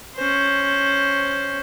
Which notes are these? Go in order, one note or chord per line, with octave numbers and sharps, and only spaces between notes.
C#4 C5